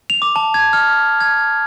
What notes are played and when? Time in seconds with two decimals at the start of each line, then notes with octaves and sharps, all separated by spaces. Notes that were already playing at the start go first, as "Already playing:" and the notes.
0.10 F7
0.22 D6
0.36 A5
0.54 G#6
0.73 F6
1.20 G#6